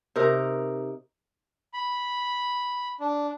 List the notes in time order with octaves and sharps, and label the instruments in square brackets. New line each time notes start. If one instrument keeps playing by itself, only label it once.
[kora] C3 D#4 A#4
[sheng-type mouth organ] B5
D4